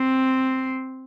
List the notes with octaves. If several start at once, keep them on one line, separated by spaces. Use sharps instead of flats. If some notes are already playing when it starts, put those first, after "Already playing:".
Already playing: C4